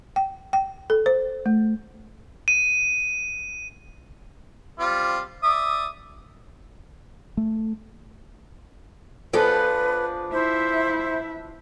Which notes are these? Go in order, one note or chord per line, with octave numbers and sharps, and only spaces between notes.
G5
G5
A4
C5
A3
D#7
G3 C4 F4
D5 E5 D#6
A3
F3 B3 D4 G#4 A4 B4
E4 C5 E5